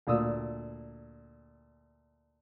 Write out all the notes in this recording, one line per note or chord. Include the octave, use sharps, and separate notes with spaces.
D2 A#2 D#6 E6